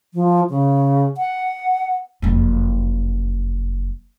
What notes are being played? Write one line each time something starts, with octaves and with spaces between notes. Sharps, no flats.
F3
C#3
F#5
F#1 F2